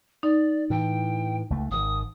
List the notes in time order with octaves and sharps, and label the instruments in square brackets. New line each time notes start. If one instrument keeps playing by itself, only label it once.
[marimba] D#4 [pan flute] D5
[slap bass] A2 E3 [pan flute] G5
[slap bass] C#2 A3
[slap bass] G#1 D3 D#3 [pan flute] D#6